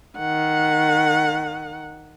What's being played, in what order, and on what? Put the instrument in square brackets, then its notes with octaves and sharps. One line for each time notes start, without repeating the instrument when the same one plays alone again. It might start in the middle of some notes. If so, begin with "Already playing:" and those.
[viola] D#3 F#5